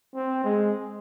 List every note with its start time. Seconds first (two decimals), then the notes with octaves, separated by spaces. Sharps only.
0.15 C4
0.44 G#3